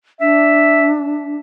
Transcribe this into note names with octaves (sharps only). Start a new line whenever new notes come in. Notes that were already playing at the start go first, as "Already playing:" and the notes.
D4 E5